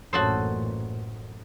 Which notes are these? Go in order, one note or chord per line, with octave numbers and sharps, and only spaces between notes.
A1 F#2 A#2 F#4 A4 C5 C#5 D#6